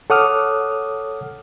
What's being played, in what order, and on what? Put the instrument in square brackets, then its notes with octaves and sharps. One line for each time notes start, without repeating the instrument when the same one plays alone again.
[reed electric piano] A4 C#5 F#5 D6 D#6 F6